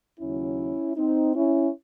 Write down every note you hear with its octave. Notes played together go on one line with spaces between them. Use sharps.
D#2 C#3 F#3 C#4 E4
C4 D#4
C#4 E4